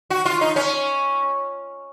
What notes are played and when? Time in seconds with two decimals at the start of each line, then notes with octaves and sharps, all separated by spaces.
0.10 F#4
0.25 F4
0.41 D#4
0.56 C#4